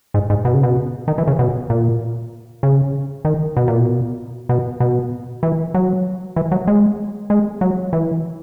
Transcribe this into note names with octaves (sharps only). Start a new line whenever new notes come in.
G#2
G#2
B2
C#3
B2
D#3
E3
C#3
B2
A#2
C#3
D#3
B2
A#2
B2
B2
B2
E3
F#3
E3
F#3
G#3
G#3
F#3
E3